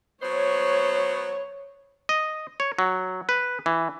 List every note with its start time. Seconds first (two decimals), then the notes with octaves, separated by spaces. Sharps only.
0.22 F#3 B3 C5 C#5
2.09 D#5
2.60 C#5
2.79 F#3
3.29 B4
3.66 E3